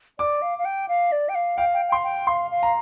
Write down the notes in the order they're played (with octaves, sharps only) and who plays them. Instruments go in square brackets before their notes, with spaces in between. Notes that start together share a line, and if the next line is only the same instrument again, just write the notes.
[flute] D5 [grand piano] D6
[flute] F5
F5
G5
F5
D5
G5
F5
[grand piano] F5 [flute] G5
[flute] G5
G5
[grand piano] C6
[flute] G5
[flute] F5 [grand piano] C6
[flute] F5
[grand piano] A#5